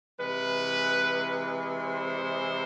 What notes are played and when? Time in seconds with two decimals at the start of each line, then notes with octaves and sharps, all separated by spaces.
0.19 C3 E3 G#3 B4
1.84 C5